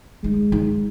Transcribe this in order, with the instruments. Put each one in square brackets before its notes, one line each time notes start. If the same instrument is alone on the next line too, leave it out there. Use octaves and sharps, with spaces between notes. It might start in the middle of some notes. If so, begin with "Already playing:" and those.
[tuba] G#3 [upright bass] D#4
[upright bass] D#4